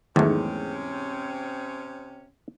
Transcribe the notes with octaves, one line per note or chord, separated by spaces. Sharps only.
E2 G#2 C3 D#3 F#3 A3 C4 C#4